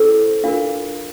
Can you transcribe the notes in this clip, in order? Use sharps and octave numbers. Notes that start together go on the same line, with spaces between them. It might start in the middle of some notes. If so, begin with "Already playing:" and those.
Already playing: C#4 E4 A4 C5
D4 F4 A#4 F5